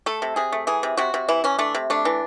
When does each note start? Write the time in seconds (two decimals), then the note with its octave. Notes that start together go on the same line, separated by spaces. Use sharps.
0.06 A3 A4
0.22 C3
0.36 C3 G#4
0.52 A3
0.67 E3 G#4
0.83 C3
0.97 C3 F#4
1.14 C3
1.29 E3 E4
1.44 E3 C#4
1.59 A3 D4
1.75 C3
1.90 A3 D4
2.05 E3